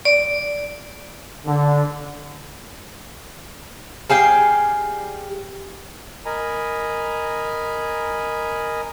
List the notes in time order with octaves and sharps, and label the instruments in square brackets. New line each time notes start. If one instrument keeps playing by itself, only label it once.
[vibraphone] D5
[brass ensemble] D3
[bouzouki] G3 G#4 F5 G5
[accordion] A#4 D#5 G#5 A#5 B5